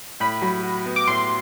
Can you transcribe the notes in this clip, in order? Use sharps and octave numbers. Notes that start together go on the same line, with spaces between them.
A2 B5
F#3
F#4
B3
D6
A2 C6